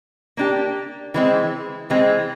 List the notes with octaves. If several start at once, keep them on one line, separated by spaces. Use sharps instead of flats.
A#3 D4 G4
E3 G#3 C4
E3 G#3 C4